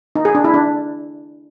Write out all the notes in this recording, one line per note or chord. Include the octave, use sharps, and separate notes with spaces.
D#4
G#4
D4
E4
D4